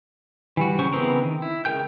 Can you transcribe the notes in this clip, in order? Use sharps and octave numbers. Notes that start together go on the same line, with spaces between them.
E3 G3 F#4
C#3 F#3 C#4 C5 C#6
C#3 E3 B3 C4 A#4
D#3
E4
C#3 G#3 A#4 G5 G6